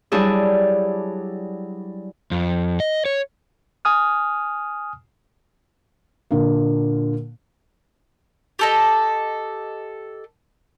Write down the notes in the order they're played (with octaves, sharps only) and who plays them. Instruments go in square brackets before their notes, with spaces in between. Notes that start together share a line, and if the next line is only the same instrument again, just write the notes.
[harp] F#3 G3 D4 E4 G#4
[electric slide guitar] F2
D#5
C#5
[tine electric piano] G#5 D#6 F6
[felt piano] A#2 D3 A#3
[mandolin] G4 A4 D#5